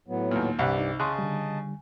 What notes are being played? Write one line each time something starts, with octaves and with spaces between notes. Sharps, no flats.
A2 F#3 B3
D#2 A#2
C2 G2 G4 D5 F#5 B5 F#6
D#4
C#3 D#5 A5 C6 D#6 F#6
D3 G3